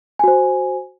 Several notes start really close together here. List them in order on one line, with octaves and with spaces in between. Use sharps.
G#5 F#4 C5